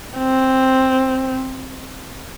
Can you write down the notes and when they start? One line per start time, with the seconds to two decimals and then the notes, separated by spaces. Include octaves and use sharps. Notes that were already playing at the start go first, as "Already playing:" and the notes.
0.18 C4